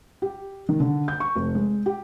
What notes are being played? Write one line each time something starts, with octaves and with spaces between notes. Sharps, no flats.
G4
D#3
D3
G6
C#6
F1
G#3
G4